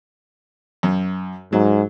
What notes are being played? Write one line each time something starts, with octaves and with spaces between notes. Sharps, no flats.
F#2
G#2 F#3